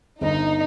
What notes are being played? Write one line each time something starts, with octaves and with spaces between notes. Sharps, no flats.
G1 D#4